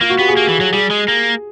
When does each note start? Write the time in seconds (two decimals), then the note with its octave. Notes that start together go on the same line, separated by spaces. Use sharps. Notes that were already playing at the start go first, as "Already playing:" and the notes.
0.01 A#3 F4
0.10 F#4
0.19 B3 G4
0.28 G#4
0.37 A#3
0.48 E3
0.61 F#3
0.73 G3 G#4
0.90 G#3
1.08 A#3